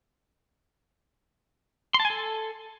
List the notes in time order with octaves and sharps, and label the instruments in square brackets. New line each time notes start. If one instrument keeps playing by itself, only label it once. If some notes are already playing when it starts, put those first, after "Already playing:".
[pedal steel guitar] C6
A5
G#5
A4